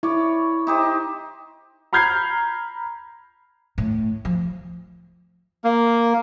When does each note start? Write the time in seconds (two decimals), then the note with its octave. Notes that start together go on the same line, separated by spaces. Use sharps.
0.03 E4 C#5 D5
0.67 D#4 G4 C5
1.93 A#5 B5 F6 G6 G#6 C7
3.78 A2
4.25 F3
5.64 A#3